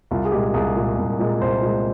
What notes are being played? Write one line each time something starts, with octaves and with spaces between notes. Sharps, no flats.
C2 F4
G#4
A#2 G#3 G4
C2 G#4
A#2 G#3
C2
A#2 G#3
C2 C5
A#2 G#3